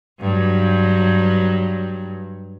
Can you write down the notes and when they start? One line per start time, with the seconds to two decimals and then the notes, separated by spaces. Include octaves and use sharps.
0.21 G2 F#3